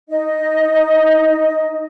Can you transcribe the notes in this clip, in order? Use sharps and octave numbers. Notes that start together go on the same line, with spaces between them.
D#4 D#5